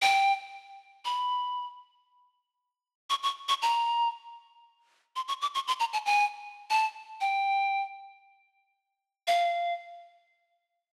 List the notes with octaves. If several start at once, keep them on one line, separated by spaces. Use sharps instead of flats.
G5
B5
C#6
C#6
C#6
A#5
C6
C#6
D6
C#6
C6
A#5
A5
G#5
A5
G5
F5